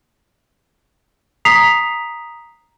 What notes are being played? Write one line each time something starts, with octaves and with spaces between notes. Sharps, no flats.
A#5 D#6 B6 C7 F7